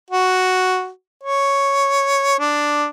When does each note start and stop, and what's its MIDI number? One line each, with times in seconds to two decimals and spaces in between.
0.11 0.88 66
1.23 2.35 73
2.39 2.86 62